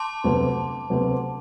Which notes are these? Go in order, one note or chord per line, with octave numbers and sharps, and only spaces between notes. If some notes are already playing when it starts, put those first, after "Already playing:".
Already playing: A5 C6 D6
D2 C3 F#3 B3
D2 C3 F#3 B3